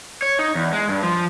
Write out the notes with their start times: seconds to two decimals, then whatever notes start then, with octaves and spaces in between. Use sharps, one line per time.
0.22 C#5
0.39 D#4
0.55 E2
0.73 G#3
0.88 G2
1.03 F3